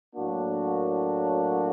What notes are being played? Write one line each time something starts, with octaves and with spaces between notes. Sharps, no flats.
A2 F#3 A#3 D4 F#4